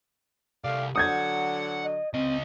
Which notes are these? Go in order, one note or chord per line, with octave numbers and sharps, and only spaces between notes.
C2 A3 D5 F5
D3 F#3 F#5 D#6 G6 G#6
D#5
C#2 C4 D#5